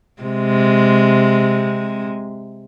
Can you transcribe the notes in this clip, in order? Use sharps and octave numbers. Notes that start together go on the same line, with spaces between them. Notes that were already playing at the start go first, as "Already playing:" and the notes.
C3 G#3